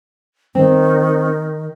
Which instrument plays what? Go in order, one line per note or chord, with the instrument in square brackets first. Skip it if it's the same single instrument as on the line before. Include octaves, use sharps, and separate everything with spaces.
[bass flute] D#3 [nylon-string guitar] C4